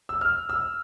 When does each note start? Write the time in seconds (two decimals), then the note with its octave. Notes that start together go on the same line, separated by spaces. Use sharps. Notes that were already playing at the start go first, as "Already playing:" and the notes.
0.09 E6
0.21 F6
0.49 E6